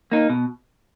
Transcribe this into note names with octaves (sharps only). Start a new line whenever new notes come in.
A#3 D#4
B2